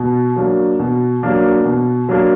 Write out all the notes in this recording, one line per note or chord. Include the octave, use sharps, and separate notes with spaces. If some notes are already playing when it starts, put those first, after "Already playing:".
Already playing: B2
F#3 A#3 D4
B2
F#3 A#3 D4
B2
F#3 A#3 D4